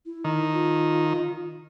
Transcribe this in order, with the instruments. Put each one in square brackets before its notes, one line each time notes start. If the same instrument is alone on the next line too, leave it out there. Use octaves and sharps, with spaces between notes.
[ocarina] E4
[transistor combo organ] D#3
[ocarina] F4